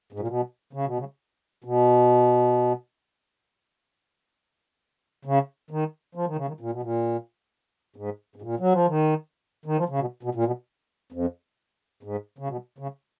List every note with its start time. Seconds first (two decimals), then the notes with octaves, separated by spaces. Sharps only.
0.13 G#2
0.20 A#2
0.28 B2
0.73 C#3
0.86 B2
0.98 C#3
1.64 B2
5.25 C#3
5.71 D#3
6.15 F3
6.26 D#3
6.36 C#3
6.48 D#3
6.60 A#2
6.71 B2
6.83 A#2
7.96 G#2
8.36 G#2
8.42 A#2
8.60 F#3
8.73 F3
8.87 D#3
9.66 D#3
9.77 F3
9.89 C#3
9.99 B2
10.23 B2
10.35 A#2
10.45 B2
11.12 F2
12.03 G#2
12.38 C#3
12.48 B2
12.78 C#3